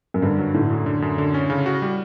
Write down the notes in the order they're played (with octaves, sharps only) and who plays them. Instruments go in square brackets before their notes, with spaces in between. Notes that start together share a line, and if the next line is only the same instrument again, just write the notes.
[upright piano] F#2
[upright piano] G2 [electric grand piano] D3
[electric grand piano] F#3
[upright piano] A2 [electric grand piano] D3
[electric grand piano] F#2
D3
F#2
D3
C#4
C#3
F#4
G3